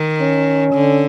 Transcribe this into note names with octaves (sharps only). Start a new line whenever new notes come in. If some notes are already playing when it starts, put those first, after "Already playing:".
Already playing: D#3
C#4
D3